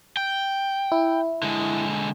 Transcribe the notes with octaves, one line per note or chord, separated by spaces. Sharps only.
G5
E4
D3 G#3